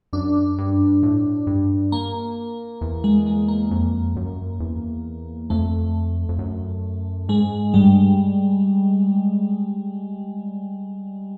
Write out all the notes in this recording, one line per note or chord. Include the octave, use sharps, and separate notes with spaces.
F#2 D4
G2
A2
G2
A#3
E2
G#3
G#3
A#3
F2
F#2
E2
F2 A3
F2
F#2
G#2 G#3
G2 G3